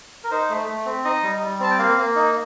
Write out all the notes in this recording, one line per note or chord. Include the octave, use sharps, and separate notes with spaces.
A#4
D#4 C5
A3
A3
C4
D#4 D#5
G3
G3
C4 A5
G5
A#3 F5
A#3
D#4